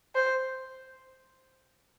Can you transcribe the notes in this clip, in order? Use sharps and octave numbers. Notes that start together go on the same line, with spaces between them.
C5